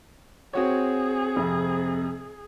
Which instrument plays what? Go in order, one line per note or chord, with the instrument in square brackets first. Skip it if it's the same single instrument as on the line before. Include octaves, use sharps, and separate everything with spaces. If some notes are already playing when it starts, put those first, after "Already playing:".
[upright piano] C4 F#4 C#5 [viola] G#4
[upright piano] F2 C3